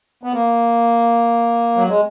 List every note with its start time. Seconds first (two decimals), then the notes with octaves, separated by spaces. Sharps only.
0.23 B3
0.33 A#3
1.77 F#3
1.89 G#3